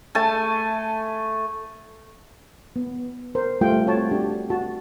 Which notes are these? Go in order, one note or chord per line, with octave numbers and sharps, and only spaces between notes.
A3 G#5 A5
B3
A#4 C5
G3 A3 F4 G5
C4 F#4 C#5 F#5 A5
D4 G4
F#4 A5